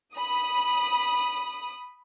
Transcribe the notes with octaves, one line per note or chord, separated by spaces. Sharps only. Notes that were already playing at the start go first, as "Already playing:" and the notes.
B5 D#6